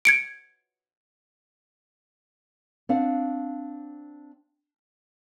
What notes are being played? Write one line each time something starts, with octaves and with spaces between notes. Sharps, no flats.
G#6 C#7 D7
C4 D4 F5 F#5